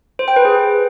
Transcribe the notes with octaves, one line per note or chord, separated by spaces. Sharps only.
C5
G5
B4
G#4